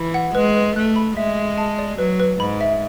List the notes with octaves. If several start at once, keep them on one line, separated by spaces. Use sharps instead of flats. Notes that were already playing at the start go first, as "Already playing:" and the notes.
Already playing: E3 B5
F#5
G#3 B4
B4
A3 F#6
B5
G#3 E5
E5
A5
D5
F#3 B4
B4
G#2 B5
E5